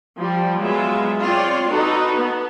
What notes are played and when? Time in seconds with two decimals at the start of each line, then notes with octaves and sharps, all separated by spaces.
0.18 F3 G3
0.60 F#3 G#3 B3 F4 E5
1.23 C4 F4 C#5 D5 C6
1.69 D#4 F#4 A4 B4
2.16 B3